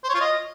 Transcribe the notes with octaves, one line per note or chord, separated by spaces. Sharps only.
C5
C#5
F4
D#5